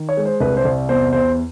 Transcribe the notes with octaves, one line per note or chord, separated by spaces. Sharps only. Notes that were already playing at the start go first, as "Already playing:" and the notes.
Already playing: D#3
C#5
G#3
C5
C2 B4
C5
C2
E2 C5
E2 C5